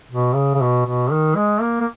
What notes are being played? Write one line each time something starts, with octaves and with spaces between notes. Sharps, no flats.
B2
C#3
C#3
B2
B2
D#3
G#3
A#3
A#3